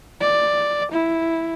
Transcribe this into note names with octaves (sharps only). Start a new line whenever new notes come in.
D5
E4